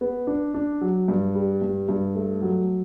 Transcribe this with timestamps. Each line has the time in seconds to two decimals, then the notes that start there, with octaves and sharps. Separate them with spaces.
0.01 B3
0.27 D4
0.54 D4
0.81 F#3
1.08 G2
1.35 G3
1.62 G2
1.89 G2
2.15 A3
2.42 F#3